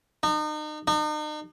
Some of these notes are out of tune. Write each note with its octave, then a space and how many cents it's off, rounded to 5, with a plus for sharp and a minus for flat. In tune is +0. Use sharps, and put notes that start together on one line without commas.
D#4 -35
D#4 -40